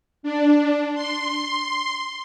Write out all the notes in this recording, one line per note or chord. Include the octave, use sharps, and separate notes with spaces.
D4
C6